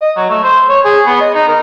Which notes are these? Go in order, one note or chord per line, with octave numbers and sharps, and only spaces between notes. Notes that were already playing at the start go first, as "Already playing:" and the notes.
D#5
F#3
A3
C5
C#5
G#4
B3
D#5
D#4
A#4